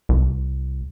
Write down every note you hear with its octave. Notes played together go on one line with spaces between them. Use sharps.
C2